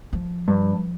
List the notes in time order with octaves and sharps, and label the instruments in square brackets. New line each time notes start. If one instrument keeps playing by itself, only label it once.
[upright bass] F3
[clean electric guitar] G2